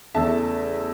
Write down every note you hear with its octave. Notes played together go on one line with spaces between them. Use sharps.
E2 C#3 A3 E5 A5